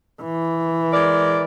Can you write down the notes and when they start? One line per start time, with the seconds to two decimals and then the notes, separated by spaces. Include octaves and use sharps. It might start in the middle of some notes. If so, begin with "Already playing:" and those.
0.22 E3
0.93 G#3 A#4 D5